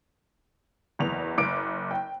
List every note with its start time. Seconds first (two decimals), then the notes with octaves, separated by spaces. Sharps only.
0.99 F#1 E2 F7
1.38 F#1 D6 D7
1.91 G5